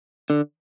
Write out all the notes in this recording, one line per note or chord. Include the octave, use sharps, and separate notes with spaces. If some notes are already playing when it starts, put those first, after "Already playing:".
D3